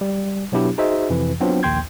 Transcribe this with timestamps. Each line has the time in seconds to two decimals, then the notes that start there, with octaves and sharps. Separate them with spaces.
0.01 G3
0.52 B2 F#3 B3 D4 E4 G4
0.78 D#4 F#4 G#4 C5 D#5 E5
1.10 F2 C3 E3
1.40 F#3 B3 C4 D4 F4
1.63 A#1 D#2 G5 C6 G6 G#6